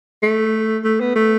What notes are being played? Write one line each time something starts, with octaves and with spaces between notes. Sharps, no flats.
A3
A3
B3
A3